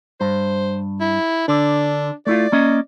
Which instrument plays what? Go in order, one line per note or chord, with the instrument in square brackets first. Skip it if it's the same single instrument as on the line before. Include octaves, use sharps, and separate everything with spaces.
[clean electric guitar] G2 [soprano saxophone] C5
[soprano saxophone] E4
[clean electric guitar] D3 [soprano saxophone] D4
[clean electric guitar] A3 E4 F4 [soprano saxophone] D5
[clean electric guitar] A#3 C#4 D#5